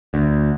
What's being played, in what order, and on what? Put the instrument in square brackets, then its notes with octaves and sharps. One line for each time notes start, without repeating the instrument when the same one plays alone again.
[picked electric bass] D2